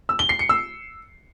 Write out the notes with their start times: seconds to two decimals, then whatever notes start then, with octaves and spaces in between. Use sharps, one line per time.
0.09 E6
0.19 G7
0.29 C7
0.39 C#7
0.49 E6